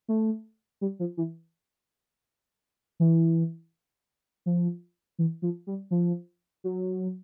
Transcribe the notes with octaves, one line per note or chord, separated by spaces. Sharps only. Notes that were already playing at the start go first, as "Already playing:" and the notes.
A3
G3
F3
E3
E3
F3
E3
F3
G3
F3
F#3